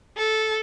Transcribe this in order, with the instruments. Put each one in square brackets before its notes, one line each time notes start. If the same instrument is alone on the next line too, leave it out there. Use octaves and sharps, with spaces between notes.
[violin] A4